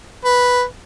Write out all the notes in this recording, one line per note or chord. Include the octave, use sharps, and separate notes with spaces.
B4